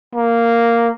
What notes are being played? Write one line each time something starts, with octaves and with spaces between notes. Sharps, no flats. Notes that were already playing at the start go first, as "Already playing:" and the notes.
A#3